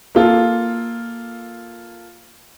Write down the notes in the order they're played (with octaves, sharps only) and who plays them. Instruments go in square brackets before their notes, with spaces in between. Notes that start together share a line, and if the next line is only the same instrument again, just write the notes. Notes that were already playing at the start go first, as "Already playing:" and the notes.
[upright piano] A#3 F4 A4